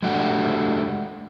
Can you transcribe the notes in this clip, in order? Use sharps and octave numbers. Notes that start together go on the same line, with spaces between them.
G#3 A3 D4 F#4 G4